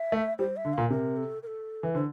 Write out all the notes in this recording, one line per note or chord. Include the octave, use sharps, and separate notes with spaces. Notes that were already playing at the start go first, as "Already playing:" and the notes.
Already playing: E5
A3
G3 C5
E5
D3
A#2 F5
C3 A#4
A4
A#4
A4
E3
D3 C5